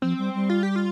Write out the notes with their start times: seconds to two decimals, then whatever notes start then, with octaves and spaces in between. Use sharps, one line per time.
0.02 F3 C4
0.18 G3
0.34 G3
0.50 F4
0.63 G4
0.76 F4